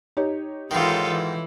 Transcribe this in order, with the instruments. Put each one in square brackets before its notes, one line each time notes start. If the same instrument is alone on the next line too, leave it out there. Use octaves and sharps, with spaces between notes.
[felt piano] D#4 G4 C#5
[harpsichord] G#2 D#3 [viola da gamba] E3 F4 A4
[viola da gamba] E3